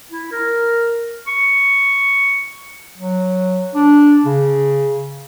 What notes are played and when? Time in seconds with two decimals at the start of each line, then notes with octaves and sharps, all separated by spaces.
0.12 E4
0.32 A#4
1.27 C#6
2.98 F#3
3.75 D4
4.25 C#3